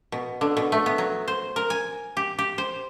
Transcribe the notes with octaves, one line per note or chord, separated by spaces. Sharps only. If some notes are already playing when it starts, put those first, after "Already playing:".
B2
D3
B2
A3
B3
F#3
C5
A#4
G#5
G4
G4
C5